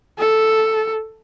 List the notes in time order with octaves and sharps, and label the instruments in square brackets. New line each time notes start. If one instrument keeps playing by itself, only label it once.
[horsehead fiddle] A4